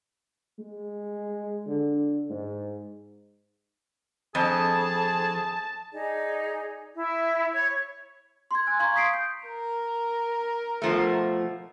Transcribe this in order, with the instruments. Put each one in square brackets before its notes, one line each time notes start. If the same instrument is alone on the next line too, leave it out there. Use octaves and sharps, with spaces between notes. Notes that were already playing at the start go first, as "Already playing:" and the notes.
[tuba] G#3
D3
G#2
[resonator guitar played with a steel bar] F2 [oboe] G#4 [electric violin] A5
[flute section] D#4 G#4 D5
E4
C#5
[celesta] C6 G#6
G#5 E6 F#6
F5 A#5 C6 C#6 G#6
D#6 B6 C7 D7
G6
[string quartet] A#4
[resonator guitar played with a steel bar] B2 F3 A3